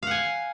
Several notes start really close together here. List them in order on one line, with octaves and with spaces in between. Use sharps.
F5 F#5 G#5